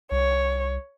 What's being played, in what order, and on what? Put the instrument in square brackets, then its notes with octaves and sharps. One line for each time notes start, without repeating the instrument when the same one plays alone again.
[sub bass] C2 [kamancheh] C#5